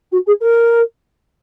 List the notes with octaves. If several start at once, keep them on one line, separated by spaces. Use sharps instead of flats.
F#4
G#4
A#4